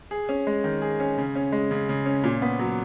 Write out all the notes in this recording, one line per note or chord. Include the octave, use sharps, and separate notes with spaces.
G#4
C#4
G#3
D#3
G#4
C#4
C#3
C#4
G#3
C#3
C#3
C#4
A#2
B3
F#3